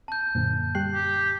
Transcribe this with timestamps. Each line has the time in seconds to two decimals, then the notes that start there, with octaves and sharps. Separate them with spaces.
0.08 A5 G6
0.35 F#2 A#2 D3
0.75 G3 G5 F#6 C7
0.94 G4